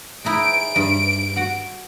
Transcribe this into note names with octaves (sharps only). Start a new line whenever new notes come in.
G#3 D#4 E4 D7
G2
F#4 F#5